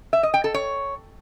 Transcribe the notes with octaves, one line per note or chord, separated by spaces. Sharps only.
E5
D#5
G5
A4
C#5